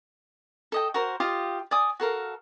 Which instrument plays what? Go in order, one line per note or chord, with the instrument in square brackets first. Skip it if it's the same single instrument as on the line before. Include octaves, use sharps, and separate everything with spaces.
[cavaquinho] A4 D#5 G5
F#4 A#4 C5
F4 G4 D#5 F5
D5 G#5 D#6
F#4 A4 A#4 F5